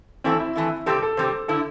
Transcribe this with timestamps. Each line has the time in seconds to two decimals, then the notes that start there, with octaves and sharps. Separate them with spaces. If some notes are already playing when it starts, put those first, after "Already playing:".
0.24 E3 A3 C4 E4
0.40 E4
0.56 E3 A3 E4
0.86 C3 G3 C4 G4 A4
1.02 A4
1.17 C3 G3 C4 G4 C5
1.48 D3 A3 E4 A4